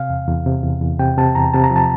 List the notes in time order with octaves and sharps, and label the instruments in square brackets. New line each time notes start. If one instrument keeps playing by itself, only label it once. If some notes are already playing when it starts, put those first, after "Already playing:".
Already playing: [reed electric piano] C3 F5
E2
E2
C3
E2
E2
C3 G5
C3 A5
E2 A#5
C3 A5
A#5
F3
A5